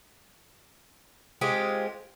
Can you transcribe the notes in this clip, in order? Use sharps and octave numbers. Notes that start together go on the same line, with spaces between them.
G#3 C4 F4 G4